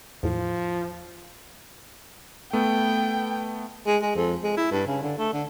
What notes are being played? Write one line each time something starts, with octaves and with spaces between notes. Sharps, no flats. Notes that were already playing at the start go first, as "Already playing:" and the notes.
E2 A2 F3
A3 B3 G5
G#3
G#3
F2
G#3
E4
G2
C#3
D3
A3
D3